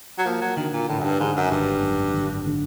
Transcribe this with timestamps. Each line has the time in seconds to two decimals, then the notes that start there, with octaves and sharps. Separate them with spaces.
0.18 F#3
0.26 F3 A#3
0.42 F#3
0.56 D3 D#3
0.73 A#2
0.88 A2 D3
0.99 F#2
1.04 G2
1.20 G#2 D3
1.36 F#2
1.51 G#1 G2
1.83 F#2
2.14 D3
2.46 D3